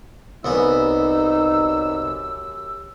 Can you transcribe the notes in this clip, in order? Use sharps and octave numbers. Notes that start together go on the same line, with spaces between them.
C2 F#2 B3 D#4 G4 G#5 E6